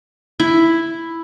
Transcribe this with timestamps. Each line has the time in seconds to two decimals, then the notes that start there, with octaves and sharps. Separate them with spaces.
0.40 E4